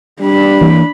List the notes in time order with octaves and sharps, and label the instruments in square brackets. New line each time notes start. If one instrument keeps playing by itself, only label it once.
[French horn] G3 [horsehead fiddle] D4 B5
[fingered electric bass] E3 A#3